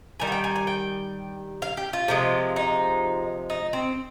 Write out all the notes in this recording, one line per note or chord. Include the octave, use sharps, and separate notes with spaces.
D#3 G3 G#5
F5
G5
G#5
G#5
G5
F5
G4
F4
C3 F3 G#3
D#4
D#4
C4